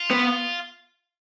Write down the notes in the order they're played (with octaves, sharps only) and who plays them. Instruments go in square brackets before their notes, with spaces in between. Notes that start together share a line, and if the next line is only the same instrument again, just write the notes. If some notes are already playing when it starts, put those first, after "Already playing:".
Already playing: [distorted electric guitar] F4
[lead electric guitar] B3